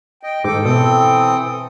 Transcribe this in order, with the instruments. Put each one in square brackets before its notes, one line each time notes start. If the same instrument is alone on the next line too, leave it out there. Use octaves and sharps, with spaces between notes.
[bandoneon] D#5 [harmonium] G5
[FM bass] G#2 [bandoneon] D#3 D6 [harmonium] A4 G5
[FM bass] B2 [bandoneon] E3 C4 D#6